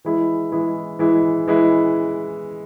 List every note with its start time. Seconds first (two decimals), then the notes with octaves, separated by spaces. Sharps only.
0.05 E3 G#3 E4
0.52 E3 G#3 E4
0.99 E3 G#3 E4
1.47 E3 G#3 E4